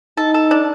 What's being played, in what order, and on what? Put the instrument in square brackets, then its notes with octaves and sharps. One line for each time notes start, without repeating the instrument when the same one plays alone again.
[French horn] D#4 [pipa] A4
[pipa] A4
D4